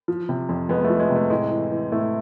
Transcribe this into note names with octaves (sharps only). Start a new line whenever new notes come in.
F3
C3
F2
F2 G#3 B3
A3
F3
G#3
C3
A3
A2 G#3
E3
E3
A2 A3